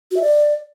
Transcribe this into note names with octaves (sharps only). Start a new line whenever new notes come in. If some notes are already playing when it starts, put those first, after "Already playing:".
F#4
E5
D5